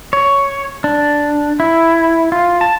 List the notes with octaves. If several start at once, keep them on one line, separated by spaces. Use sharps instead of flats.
C#5
D4
E4
F4
A5